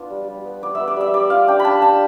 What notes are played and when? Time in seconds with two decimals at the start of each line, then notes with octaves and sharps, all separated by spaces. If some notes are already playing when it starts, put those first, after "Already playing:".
Already playing: B3 D4 F4
0.10 G3
0.28 G3
0.45 B3
0.63 B3 D5
0.75 E5
0.80 B3
0.88 D5
0.96 G3 E5
1.14 G3 D5
1.30 F4 F5
1.47 D4 G5
1.59 B5
1.65 D4 A5
1.81 D4 A5